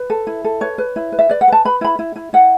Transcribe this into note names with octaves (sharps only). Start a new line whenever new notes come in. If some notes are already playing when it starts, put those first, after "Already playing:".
Already playing: B4
A4
E4
A4
B4 C#5
B4
E4
B4
E5
B4 D5
F#5
B4 A5
B4 B5
E4 B5
E4
E4
E4 F#5